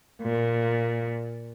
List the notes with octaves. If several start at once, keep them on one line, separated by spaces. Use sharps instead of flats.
A#2